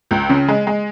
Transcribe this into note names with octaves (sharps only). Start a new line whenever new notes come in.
C#2
C#3
G#3
G#3